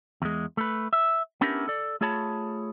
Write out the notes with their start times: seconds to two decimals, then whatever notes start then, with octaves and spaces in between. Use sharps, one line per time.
0.22 E2 G#3
0.57 A3 B4
0.93 E5
1.41 B3 C#4 D4 E4 G4 A#4
1.68 A4 D5
2.01 A3 F4 G#4 C#5 A5 B5